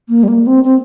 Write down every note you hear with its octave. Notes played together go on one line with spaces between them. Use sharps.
A#3
G3
A#3
C4
C4